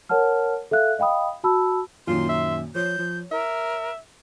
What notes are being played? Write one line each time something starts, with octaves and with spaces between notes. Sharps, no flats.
A#4 C#5 F#5 A5 F6
A4 E5 F5 F#6
D#5 F5 G5 B5 D#6
F#4 A5 B5 E6
F#2 A#2 D#3 F4 C6
E5
F3 C#5 G6
F3
A#4 E5